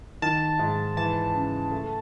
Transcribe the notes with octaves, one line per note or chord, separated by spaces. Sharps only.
D#3 A5
G#2
E3 A5
C#3
A3